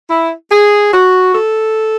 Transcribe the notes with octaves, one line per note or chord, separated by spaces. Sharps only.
E4
G#4
F#4
A4